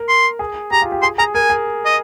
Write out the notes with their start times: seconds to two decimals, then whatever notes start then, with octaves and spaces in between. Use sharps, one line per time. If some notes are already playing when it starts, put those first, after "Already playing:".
Already playing: A#4
0.08 C6
0.39 G#4
0.71 G4 A#5
0.82 F4
0.92 G4
1.02 G#4 C6
1.18 G#4 A#5
1.34 A#4 G#5
1.50 G#4
1.85 D#5